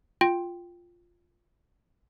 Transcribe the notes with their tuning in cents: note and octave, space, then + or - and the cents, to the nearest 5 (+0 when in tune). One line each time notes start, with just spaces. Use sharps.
F4 +0 G5 +0